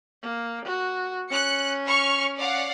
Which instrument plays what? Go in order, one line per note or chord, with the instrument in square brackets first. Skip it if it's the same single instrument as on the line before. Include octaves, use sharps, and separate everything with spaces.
[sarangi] A#3
F#4
[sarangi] C#4 [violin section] F#6 C#7
[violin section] C#6 F6
D5 F5 F#5